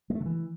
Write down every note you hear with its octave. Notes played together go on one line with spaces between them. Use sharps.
G#3
A3
D3
E3